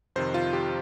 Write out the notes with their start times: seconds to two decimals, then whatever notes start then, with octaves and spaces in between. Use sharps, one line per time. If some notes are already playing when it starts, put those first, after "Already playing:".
0.16 F2 C3 D#3 C5
0.34 F4
0.53 G4